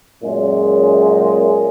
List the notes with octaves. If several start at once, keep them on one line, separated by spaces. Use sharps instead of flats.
F#2 A#2 G#3